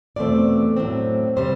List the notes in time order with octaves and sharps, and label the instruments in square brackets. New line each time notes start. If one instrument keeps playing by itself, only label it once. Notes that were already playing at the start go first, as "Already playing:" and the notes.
[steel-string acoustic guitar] E2 B2 A3 C4 D5
A2 F#3 C4
C3 G3 C4 C5